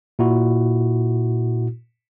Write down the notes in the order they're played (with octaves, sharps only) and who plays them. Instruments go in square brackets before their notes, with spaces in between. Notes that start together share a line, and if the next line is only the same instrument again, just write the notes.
[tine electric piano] A#2 E4 F#4